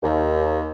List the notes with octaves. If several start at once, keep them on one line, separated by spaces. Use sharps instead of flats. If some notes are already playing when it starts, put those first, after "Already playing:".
D#2